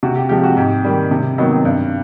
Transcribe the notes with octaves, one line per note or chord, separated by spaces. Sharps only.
C3 F#4
G4
F3 G#3 G4
F#4
G#2 G4
D#3 G3
C3
D#3 F#3 B3 D#4
G2